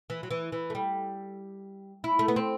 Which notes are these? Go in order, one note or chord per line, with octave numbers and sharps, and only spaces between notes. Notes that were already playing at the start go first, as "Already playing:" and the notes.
E3
F#3
E3
E3
A3
G3
E4
A3
B3
C4